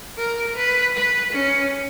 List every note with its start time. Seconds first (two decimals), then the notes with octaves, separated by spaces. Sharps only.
0.18 A#4
0.56 B4
0.95 B4
1.33 C#4